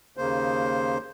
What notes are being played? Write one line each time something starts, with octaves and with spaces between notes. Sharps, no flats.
D#2 C#3 A#3 C5